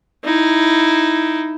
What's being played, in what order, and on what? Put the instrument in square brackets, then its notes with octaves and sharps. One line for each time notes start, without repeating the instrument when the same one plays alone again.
[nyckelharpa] D#4 E4